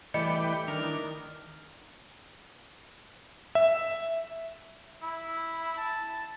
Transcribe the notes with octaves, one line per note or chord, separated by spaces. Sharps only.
E3 G3 A3 B4 D5 D#5 G5 C#7
D#3 D4 A#4
E5
E4
A5